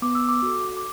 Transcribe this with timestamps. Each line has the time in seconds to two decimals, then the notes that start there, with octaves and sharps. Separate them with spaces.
0.02 B3 D6
0.15 E6
0.29 D6
0.42 F#4 A4
0.77 D6